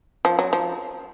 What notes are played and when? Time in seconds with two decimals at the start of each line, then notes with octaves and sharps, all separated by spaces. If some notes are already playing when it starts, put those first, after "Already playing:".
0.25 F3
0.39 F#3
0.53 F3